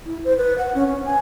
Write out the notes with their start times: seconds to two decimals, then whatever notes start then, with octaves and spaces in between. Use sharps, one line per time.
0.06 E4
0.24 C5
0.38 B4
0.58 F#5
0.75 C#4
0.88 C#4
1.06 G#5